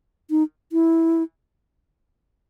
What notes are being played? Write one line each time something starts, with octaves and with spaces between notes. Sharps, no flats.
D#4
E4